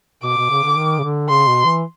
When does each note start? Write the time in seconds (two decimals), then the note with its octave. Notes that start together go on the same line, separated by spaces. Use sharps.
0.23 B2 D6
0.37 B2
0.50 C#3
0.63 D3
0.77 D#3
0.99 C#3
1.03 D3
1.29 C#3 C6
1.47 B2
1.65 E3